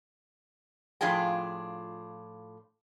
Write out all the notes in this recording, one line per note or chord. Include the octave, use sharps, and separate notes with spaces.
A2 F3 D4 F4 G#4 G5